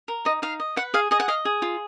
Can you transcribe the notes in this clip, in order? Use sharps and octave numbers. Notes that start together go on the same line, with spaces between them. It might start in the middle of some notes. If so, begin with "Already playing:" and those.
A#4
D#4 D#5
D#4 F5
D#5
B4 F#5
G#4 F5
G#4 D#5
F#5
D#5 F5
G#4
F4